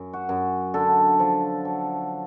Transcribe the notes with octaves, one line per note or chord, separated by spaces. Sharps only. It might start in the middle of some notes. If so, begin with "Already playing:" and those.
Already playing: F#2
F#4
F#2
D3 A4
F3
F#3